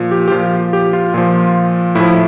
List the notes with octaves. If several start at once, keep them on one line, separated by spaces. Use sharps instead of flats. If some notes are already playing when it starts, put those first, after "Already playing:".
Already playing: A#2 F3
G4
G4
A#2 F3 F4
G4
F4
A#2 F3
A2 F3 E4